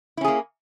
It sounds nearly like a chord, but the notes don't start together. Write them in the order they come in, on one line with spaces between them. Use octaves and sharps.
E4 C#4 G#4 A#3